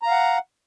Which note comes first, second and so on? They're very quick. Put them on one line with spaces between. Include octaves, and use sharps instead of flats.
A#5 F5 F#5